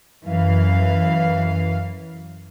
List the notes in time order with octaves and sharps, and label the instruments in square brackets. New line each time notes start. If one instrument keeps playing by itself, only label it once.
[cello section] F#2 E3 F5